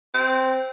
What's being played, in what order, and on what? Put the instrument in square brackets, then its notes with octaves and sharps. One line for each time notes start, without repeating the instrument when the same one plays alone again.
[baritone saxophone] C4